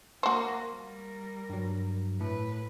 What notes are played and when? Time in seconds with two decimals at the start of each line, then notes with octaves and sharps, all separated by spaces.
0.23 A#3 F#4 C5
0.73 G3 A#4
1.50 G2 F#3
2.20 A2 B4